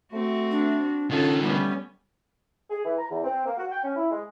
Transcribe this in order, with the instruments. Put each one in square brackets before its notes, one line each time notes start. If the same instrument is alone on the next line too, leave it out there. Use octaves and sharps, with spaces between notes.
[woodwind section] A3 [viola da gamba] C4 F#4
[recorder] D4
[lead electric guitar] D3 D#4 [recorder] C#4 [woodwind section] F4 [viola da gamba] A4
[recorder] G3 [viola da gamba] A3 B3 C#4
[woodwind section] G#4
E3
A#5
E2
C4
A#3
F#4
G5
C#4
E4
G#3